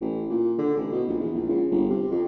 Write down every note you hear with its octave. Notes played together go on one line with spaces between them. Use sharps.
A1
A#2
D3
A1
B2
A#1
E2
A#1
C#2
G1
C3
F2